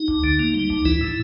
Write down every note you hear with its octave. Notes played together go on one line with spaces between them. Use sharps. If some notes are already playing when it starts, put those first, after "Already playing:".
Already playing: D#4
D2
D3
A#3
G3
D2
E3 E4
A2